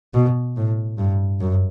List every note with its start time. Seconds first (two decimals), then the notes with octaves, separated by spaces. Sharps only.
0.14 B2
0.57 A2
0.98 G2
1.40 F#2